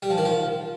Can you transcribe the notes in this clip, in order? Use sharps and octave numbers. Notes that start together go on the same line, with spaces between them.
G3
F3
D#3
F3